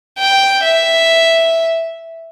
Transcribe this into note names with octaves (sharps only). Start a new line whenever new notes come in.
G5
E5